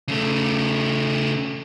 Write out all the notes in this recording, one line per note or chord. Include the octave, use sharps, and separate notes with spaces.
C#3 A3